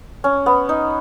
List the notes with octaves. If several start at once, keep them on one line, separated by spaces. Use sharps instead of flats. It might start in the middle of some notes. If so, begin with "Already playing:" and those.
C#4
B3
D#4